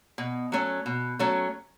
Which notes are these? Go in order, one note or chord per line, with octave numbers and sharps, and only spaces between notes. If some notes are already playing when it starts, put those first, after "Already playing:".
B2
F#3 A3 C#4
B2
F#3 A3 C#4